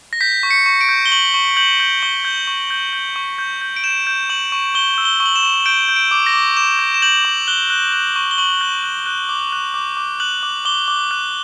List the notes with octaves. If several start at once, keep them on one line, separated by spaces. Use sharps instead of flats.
A#6
G6 B6
C#6
C#7
C#6
D7
G6
G7
C#6 F#7
C#6
G6 F#7
G6
C#6 G7
G6
C#6
G6
G6
C#6
G6
G6
D7
G6 E7
G6
C#6 F#7
C#6
C#6 G7
E6
G7
C#6
F#7
E7
C#6
G6 D7
G6
D7
D6
A#6
D6
D6 E7
G6
E7
G6 F#7
D6
F#6 G7
F#6
F#6
C#6
G7
C#6 F#7
F#6
F#6
F#6
D6
F#6
D6
D6
F#6 F#7
D6
D6 G7
D6
F#6